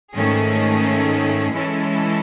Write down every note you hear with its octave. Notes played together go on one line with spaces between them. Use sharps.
G#2 D#3 A3 C#4 G#4
E3 G#3 C#4 E4 A4